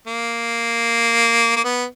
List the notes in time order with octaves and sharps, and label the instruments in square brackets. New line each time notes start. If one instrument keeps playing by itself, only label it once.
[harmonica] A#3
A#3
B3